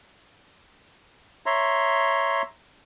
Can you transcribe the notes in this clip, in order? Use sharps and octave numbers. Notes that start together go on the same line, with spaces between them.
C#5 E5 A#5 C6